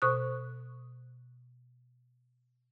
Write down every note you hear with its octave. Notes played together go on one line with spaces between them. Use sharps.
B2 C5 C#6 D#6 F#6